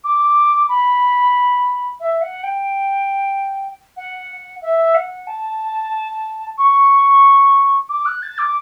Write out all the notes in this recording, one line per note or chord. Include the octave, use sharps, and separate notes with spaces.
D6
B5
E5
F#5
G5
F#5
E5
F#5
A5
C#6
D6
F#6
A6
D6